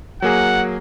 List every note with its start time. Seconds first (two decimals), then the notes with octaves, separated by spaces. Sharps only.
0.22 F#3 A#3 G#4 F#5